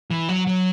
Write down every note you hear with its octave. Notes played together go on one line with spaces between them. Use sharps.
E3
F#3
F#3